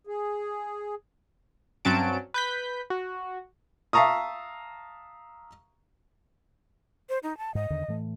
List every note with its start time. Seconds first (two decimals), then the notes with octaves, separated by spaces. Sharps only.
0.07 G#4
1.85 G2 F#3 C4 C#4 A5 D7
2.34 B4 G6 B6
2.90 F#4
3.93 E5 F5 A5 A#5 C#6 D#6
7.09 C5
7.23 D#4
7.38 A5
7.55 G#2 D#5
7.70 E2 D3 D#3
7.88 A2 E3 A3